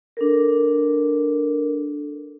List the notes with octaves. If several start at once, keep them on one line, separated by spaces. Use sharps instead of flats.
D4 A4 A#4